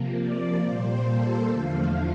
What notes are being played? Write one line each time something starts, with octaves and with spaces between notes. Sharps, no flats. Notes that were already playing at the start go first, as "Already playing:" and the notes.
Already playing: C3 F3 A#3
D5
A#2 G3 A#3 C5
A4
E2 D3 F3 A3 F5